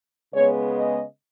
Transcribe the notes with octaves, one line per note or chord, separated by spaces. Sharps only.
C#3 G#3 B3 C#5
D#5